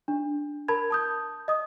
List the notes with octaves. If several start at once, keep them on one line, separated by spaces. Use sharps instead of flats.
D4
A#4 A5 B5 G#6
A5 D#6 G6
D#5 D#6